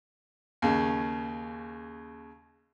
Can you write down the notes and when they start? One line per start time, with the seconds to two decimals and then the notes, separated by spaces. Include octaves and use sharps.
0.62 D#2 C#3